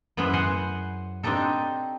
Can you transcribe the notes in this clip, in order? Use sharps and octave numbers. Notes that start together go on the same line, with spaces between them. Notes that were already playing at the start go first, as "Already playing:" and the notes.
F#2 B3 E4 G#4 B4 C5
C5 F#5 G#5 C6
C4 D4 D#4 G4 A4